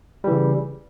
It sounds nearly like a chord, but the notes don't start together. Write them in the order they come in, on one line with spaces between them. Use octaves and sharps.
G3 E3 C#3